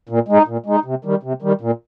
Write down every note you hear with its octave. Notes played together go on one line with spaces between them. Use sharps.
A#2
G#3 D#4
A#2
G#3 D#4
C3
D#3 G3
C3
D#3 G3
A#2